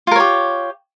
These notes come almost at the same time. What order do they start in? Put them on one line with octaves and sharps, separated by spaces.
F4 A#4 C#5 G4